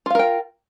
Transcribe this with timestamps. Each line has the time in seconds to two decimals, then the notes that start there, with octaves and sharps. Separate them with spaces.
0.06 F4
0.10 F5
0.15 A#4
0.19 G5